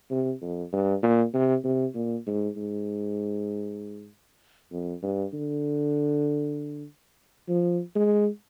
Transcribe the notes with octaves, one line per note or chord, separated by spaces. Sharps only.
C3
F2
G2
A#2
C3
C3
A#2
G#2
G#2
F2
G2
D3
F3
G#3